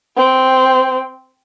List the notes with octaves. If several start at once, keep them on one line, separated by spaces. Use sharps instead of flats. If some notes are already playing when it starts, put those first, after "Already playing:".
C4